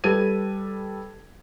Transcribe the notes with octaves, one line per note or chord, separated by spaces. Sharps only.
G3 A4 B4 G#6 D#7